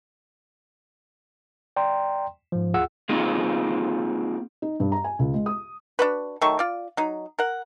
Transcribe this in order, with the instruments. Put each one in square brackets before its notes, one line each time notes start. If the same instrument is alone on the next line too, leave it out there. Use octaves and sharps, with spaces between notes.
[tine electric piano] D5 G5 A#5 C6
G#2 F3
D2 F4 G#4 F#5 E6
[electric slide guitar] A#3 C4 D#4 F4 G#4
[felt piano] D#4
G2
A#5
G#5
C#2
G#3
D#6
[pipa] D4 F#4 B4
D#3 F#3 A3 C#6
F4 D5
F#3 D#4
A#4 F#5